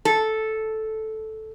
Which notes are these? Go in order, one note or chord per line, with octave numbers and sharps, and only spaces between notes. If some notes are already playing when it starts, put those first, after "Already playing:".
A4